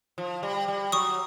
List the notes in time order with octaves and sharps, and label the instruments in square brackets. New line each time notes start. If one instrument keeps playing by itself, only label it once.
[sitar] F3
G3
G3
[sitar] F#3 [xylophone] C#6 D#6